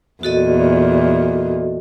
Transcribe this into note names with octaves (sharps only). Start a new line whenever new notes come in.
E2 A#2 F#4 A4 D#5